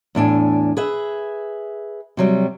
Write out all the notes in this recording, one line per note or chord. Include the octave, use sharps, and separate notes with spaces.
E2 A2 D4 G#5
G#4 B4 E5
C3 F#3 G3